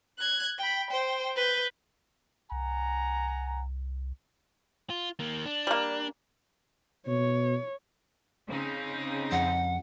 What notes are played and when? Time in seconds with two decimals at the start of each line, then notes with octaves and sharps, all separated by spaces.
0.19 F#6 G#6
0.59 G5 B5
0.91 C5 G5
1.36 B4 G6
2.52 C2 F#5 G#5 A#5
4.90 F4
5.19 D#3 A#3
5.45 D4
5.67 G3 A#3
7.07 B2 C#5
8.50 C#3 C4 D#4
9.32 F2 F#5